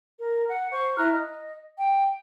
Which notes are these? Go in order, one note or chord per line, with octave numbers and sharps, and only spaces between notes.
A#4
F#5
C5 C#6
E4 A#5 F6 F#6
D#5
G5